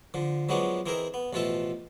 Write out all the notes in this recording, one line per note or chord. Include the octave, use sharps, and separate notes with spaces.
D3 F3
F3 F#3 G#3 B3 C#4 D4
E3 C4 G#4 A#4 D#5 E5
B3
A1 B2 F3 F4 A4 E5